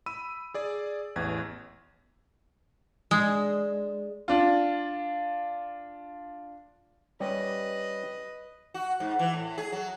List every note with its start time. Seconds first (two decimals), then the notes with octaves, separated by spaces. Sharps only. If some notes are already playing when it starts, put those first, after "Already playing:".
0.06 B5 E6 D#7
0.54 G#4 D5
1.16 A1 E2 G#6
3.11 G#3 D4
4.28 D4 F4
7.20 G3 C#4 G4 B4 D#5
8.74 F#4
9.00 G#2
9.19 E3
9.33 A2
9.58 G#4
9.72 F#3